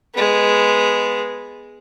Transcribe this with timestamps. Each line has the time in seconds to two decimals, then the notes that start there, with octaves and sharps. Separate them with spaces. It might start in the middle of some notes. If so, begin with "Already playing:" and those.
0.14 G#3 B3